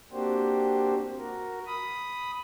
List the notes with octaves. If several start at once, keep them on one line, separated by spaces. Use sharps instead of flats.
A#3 C4 D4 F#4 G4 C5
F#4 A#4
B5 D#6